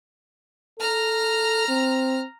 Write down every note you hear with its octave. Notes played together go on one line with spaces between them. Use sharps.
A4 A#5 F6
C4